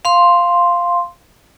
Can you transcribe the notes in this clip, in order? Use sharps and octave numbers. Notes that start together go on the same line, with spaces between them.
F5 C6